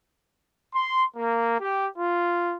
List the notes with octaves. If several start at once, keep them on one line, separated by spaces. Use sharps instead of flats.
C6
A#3
G4
F4